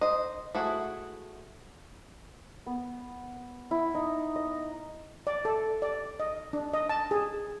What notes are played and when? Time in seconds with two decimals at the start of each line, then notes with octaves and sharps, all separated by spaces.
0.01 C5 D#5
0.55 A3 E4 F#4 G#4
2.66 B3
3.71 E4
3.94 D#4
4.36 D#5
5.27 D5
5.45 A4
5.82 D5
6.20 D#5
6.53 D4
6.74 D#5
6.89 A5
7.11 G#4